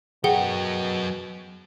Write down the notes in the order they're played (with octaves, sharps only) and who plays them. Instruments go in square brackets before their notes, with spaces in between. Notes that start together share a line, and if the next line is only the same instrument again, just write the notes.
[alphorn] B2 [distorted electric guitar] F#3 A#4 [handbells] G#4 [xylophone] F#5 G5 G7